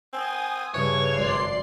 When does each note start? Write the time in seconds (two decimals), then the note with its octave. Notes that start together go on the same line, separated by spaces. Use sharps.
0.13 C4 G#5 D#6
0.74 G2 C#3 E3 C#5
1.13 G#1 F#2 D5 C6 C7